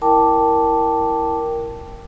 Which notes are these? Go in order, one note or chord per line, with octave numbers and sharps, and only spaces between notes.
E4 A#4 G5 A5 D6